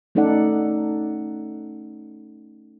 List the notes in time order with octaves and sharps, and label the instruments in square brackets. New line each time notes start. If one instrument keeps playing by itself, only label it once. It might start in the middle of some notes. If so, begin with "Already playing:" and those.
[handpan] A3 C#4 D#4 A4 D5 F#5